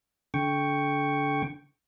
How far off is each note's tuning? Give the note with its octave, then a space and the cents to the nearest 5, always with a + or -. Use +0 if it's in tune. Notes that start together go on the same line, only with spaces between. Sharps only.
D3 -30 G5 +0 C#6 +0